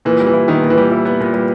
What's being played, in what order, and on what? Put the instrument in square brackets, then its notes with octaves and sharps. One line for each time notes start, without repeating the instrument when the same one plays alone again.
[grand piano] A#2 [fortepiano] E3
[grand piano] G3
[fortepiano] E3
[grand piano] E4
[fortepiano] D#3 [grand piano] B3
[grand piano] A#2
[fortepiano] E3
[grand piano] G3
E4
B3
A#2
G3